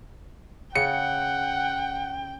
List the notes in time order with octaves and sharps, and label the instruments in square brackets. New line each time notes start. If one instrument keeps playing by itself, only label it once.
[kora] C#3 [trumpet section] F#5 [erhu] G5 [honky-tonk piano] C#7